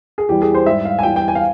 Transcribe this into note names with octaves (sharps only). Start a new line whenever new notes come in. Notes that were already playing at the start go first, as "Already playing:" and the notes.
G#4
E2 E3 G3 G4
G#4
C5
G#2 G3 E5
F5
G#5
E2 E3 G3 G5
G5
G#5
F5